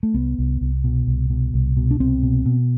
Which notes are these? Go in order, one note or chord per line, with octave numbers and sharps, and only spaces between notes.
A3
C2 B3
C2
C2
B2
C2
B2
C2
B2
D4
C2 C4
B2
B2